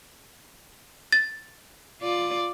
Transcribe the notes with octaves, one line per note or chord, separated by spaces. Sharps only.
A6
F4 D5